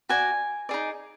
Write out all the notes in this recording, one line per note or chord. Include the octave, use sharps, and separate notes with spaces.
F#4 D5 G#5
D#4 G#4 D5